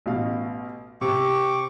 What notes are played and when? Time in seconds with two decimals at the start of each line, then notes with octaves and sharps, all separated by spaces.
0.06 A1 B2 F5
1.01 C3 C4 C#6 D6